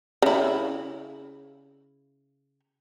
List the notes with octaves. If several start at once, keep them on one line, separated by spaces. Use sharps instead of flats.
C#3 E4